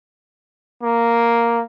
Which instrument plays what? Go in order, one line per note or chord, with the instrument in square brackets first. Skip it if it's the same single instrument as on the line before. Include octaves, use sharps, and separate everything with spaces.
[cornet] A#3